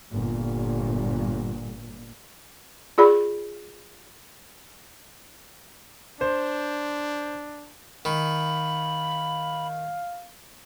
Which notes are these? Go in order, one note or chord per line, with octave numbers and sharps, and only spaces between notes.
G1 A#2
F4 G#4 D5 B5
D4 C5
D#3 F5 B5